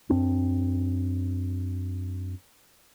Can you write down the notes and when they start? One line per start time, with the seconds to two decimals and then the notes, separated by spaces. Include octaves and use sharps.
0.09 F#2 C4 D4